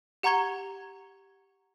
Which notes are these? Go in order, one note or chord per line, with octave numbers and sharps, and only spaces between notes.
G4 F#5 A#5 C#6 G#6 G7